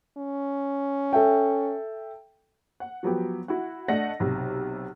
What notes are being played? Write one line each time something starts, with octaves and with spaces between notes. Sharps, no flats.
C#4
A4 E5 G5
F#5
F3 F#3 B3 G4
E4 F#4 F#5
A3 D4 D#5 F#5 A#6
B1 C3